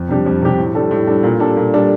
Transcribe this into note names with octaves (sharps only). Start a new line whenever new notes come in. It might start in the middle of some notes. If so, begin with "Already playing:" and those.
Already playing: F2
C3 G3 D4 G4
F2
C3 G3 D4 G4
A2
G3 D4 A4
A2
G3 D4 A4
A#2
G3 D4 A4
A#2
G3 D4 A4